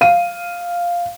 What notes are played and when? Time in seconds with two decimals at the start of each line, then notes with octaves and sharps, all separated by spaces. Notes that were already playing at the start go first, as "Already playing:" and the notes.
0.01 F5 D#7